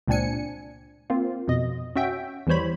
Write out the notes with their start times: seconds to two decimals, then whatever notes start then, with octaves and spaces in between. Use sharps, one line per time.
0.08 C#2 A#2 C4 D4 G#5 C#7
1.10 A#3 C4 F4
1.48 F2 B2 D#5
1.96 C#4 F#4 E5 G5
2.47 E2 E3 G3 C5 C#5 B5